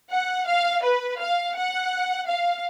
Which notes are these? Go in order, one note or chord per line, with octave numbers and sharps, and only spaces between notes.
F#5
F5
B4
F5
F#5
F5